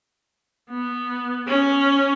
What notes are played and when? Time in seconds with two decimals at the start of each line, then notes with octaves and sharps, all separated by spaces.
0.70 B3
1.47 C#4